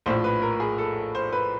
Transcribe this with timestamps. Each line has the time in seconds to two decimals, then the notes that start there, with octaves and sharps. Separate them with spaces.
0.06 A#1 A2 F3 C5
0.24 B4
0.42 A#4
0.60 G#4
0.78 A4
1.15 C5
1.33 B4